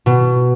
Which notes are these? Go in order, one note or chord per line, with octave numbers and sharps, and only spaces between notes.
B2